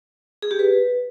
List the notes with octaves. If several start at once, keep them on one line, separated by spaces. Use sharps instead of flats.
G#4
G4
B4